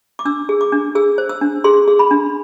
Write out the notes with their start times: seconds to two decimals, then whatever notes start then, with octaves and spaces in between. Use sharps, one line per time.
0.19 D6
0.25 D4 E6
0.49 G#4
0.61 D6
0.72 D4
0.95 G#4 E6
1.18 C5
1.29 E6
1.41 D4
1.64 G#4 C6
1.88 G#4
1.99 B5
2.11 D4